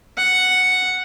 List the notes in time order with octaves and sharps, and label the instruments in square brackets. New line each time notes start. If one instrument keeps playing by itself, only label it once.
[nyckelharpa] F#5